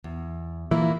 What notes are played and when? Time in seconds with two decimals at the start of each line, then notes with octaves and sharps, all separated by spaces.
0.04 E2
0.71 A#2 E3 A#3 E4